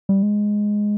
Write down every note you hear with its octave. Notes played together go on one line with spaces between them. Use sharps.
G3
G#3